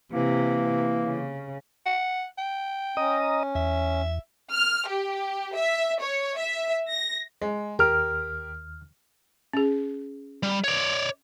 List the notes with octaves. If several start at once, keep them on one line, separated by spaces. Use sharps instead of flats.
C3 E3 A#3
C#3
F#5
G5
C#4 D#5 A#5 D#6
E2 E5
F6
G4
E5
C#5
E5
A#6
G#3
D#2 G4 A#4 F6
C#4 G#4
G3
C#5 D5